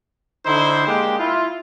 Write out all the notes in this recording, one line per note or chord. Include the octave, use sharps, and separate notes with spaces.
D3 D#4 E4 C5
G#3 A#3 D4 G4
E4 F4